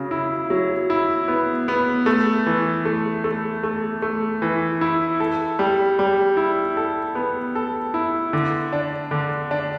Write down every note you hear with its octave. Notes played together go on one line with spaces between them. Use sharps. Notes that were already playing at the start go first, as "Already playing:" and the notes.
Already playing: C#3 F#3
E4
F#3
E4
B3
B3
A3
E3
A3
A3
A3
A3
E3
E4
A4
G3
G3
E4
A4
B3
A4
E4
D3
D4
D3
D4